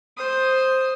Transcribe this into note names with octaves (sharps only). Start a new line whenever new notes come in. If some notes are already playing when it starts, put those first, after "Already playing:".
C5 D#6